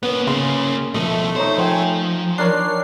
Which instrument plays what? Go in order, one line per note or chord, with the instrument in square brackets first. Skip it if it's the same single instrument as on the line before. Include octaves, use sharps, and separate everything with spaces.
[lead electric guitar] A#3 C#4 [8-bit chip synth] B3
[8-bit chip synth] C#3 [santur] C6
[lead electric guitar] B2 F3 [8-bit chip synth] A3 [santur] D#5
[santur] D#4 C#5 [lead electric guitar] C5
[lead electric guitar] F3 [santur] C5 G5 G#5
[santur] D4 A#4 C#5 [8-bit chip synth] C7